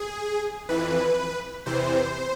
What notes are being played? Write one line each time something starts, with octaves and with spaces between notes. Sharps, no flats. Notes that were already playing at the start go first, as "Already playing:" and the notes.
Already playing: G#4
F2 E3 B4
E2 C3 E3 C5